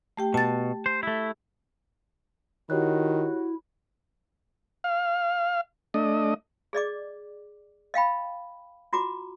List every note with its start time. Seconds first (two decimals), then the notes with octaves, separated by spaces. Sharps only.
0.17 A3 G4 G5
0.34 B2 A5 A6
0.86 C5
1.03 A3 E4
2.70 D#3 E4 F#4 G4 C#5 F#6
4.84 F5
5.94 A3 D4 D#5
6.73 G#4 D5 D#5 D6
7.94 D#5 F5 G5 B5
8.93 F4 F#4 A#5 D6